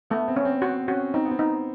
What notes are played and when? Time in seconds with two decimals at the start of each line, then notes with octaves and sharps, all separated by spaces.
0.10 A3 B3
0.28 C4
0.36 C#4
0.45 C4
0.62 C4 F#4
0.88 C#4 F#4
1.14 C4 D#4
1.25 B3
1.31 C4
1.39 D#4